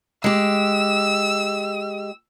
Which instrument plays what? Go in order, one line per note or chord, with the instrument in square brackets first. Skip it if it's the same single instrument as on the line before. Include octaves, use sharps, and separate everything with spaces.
[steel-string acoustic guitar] G#3 G4 [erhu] E6